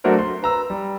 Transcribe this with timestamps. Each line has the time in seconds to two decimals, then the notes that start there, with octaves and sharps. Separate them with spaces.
0.04 F#3 A3 D4 F#4 A#4 C5
0.19 C6
0.42 B4 A#5 E6
0.70 G3